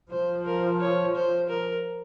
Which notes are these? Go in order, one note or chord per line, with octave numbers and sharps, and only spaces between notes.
F3 C5
A#4
C#5
C5
A#4